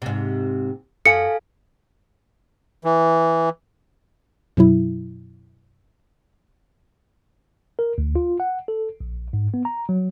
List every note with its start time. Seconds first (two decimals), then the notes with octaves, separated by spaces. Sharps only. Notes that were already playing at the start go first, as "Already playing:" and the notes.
0.02 G#2 C3
1.06 F#2 A4 F5 G#5 C#7
2.84 E3
4.57 F#2 B2 F#3 E4
7.79 A#4
7.98 D2
8.16 F4
8.40 F#5
8.68 A4
9.01 A#1
9.33 G#2
9.54 B3
9.65 A#5
9.89 F#3